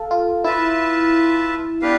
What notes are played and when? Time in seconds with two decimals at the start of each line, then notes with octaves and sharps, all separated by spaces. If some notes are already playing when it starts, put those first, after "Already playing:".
Already playing: A4 F5
0.11 F4
0.44 E4 F4 B4 E5 A5
1.82 B3 D4 G4 B4 F5